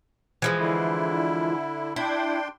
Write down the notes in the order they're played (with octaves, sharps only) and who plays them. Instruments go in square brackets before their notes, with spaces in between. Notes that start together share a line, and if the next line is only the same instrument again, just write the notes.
[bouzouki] E3 F3 G#3
[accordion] D3 E4
[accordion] D4 G5 C6 [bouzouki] E4